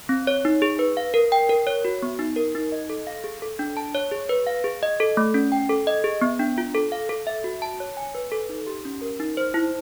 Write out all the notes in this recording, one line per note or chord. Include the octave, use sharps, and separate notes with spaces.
C4
C#5
D#4
G#4
B4
F5
A#4
G5
A#4
C#5
F#4
B3
D#4
A#4
D#4
D#5
A4
F5
G#4
A4
D4
A5
C#5
G#4
B4
F5
G#4
D#5
A4
A3
C#4
G5
A4
D#5
G#4
B3
D4
F4
A4
F5
A4
E5
F#4
A5
C#5
G#5
B4
A4
D#4
G4
C#4
A#4
D#4
C5
E4